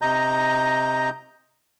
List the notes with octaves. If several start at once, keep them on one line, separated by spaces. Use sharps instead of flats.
C3 D#5 A#5 G6